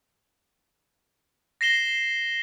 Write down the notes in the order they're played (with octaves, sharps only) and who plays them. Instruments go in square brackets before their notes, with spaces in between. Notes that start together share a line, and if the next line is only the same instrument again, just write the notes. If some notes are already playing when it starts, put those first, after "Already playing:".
[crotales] A#6 C7 E7 G7